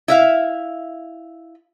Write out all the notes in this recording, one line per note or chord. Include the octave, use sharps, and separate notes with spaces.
E4 E5 F5